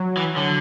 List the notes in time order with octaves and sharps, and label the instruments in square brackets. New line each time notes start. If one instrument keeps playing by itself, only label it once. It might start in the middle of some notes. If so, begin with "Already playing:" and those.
Already playing: [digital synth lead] F#3
[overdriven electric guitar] E3
D3